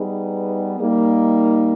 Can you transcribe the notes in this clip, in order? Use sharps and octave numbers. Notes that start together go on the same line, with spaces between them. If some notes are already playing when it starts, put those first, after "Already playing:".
Already playing: G3 B3 D#4 G#4 B4
G3 A#3 D#4